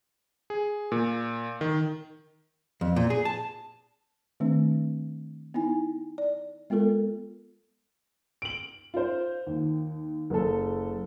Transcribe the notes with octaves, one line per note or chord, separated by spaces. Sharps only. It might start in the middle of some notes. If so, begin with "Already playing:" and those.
G#4
A#2
D#3
F2
A#2
G#4
A5
D#3 A3 C4 D4
B3 D#4 E4 G#5
D5
G#3 B3 F4 A4 A#4
D7 F#7
F4 C5
D#2
F#1 A4